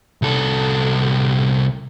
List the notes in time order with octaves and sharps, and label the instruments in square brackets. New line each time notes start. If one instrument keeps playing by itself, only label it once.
[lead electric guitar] C2 A4